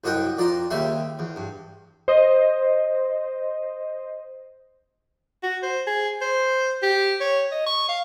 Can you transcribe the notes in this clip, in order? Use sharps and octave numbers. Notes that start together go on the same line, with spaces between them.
C2 F#2 A4 D#5 F#5 G5
F2 D5 A#5 C6
D#2 C#3 G3 E5 C6
E2
G2
C5 D#5
F#4
C5
G#4
C5
G4
C#5
D#5
C#6
F5